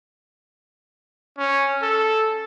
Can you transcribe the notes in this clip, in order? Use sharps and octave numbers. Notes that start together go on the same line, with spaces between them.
C#4
A4